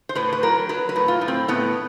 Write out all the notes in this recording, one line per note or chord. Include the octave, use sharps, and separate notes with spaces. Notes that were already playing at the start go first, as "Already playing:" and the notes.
C5
A2 B4
B4
F#3 A#4
F#3 B4
B4
A2
F4
A2
C4
A2 B3